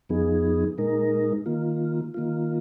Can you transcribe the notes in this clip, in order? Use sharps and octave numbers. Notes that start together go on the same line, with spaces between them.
F2 F3 B3 D#4 G#4
A#2 G#3 D#4 A#4
D#3 A#3 F4
D#3 A#3 F4